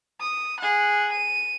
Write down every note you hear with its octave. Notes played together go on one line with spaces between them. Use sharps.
D#6
G#4 F#5
D#7